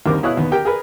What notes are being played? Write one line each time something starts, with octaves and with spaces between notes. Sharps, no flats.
D#2 D3 G3 C4 A#4 D6
B2 E4 C#5 F5 D#6 F#6
D#2 B3
G4 A#4 G5
G#4 A#4 B4